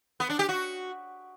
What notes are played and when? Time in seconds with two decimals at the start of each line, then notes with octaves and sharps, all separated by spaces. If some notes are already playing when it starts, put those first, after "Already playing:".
0.20 B3
0.30 D4
0.39 G4
0.49 F#4